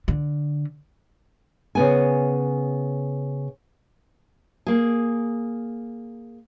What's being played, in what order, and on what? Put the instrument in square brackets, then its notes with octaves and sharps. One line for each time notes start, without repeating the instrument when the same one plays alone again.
[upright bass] D3
[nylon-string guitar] C#3 B3 G#5
A#3 G#4